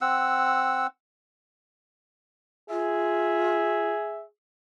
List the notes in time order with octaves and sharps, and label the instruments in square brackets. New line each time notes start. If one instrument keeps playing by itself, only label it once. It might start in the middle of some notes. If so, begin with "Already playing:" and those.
[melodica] C4 F#5 E6
[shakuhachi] F4 [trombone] G#4 [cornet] E5